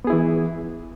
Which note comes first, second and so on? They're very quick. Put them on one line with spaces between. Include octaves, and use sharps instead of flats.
B3 G#4 E4 E3